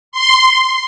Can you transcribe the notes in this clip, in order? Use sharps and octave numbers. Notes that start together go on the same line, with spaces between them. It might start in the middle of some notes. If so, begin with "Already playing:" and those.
C6